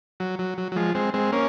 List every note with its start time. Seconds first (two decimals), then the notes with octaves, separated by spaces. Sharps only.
0.20 F#3
0.39 F#3
0.58 F#3
0.72 F#3
0.76 F3 G#3
0.95 G#3 C4
1.14 G#3 C4
1.32 A#3 C#4